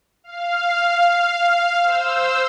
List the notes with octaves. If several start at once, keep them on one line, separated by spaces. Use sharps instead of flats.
F5
C5 E6